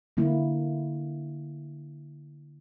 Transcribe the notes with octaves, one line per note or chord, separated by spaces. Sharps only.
D3 A#3 E4